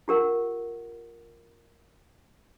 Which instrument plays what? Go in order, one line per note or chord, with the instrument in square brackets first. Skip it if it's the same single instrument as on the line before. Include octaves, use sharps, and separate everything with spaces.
[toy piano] F4 G4 A#4 F#5